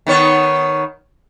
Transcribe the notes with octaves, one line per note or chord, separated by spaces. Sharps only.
D#3 B3 C#5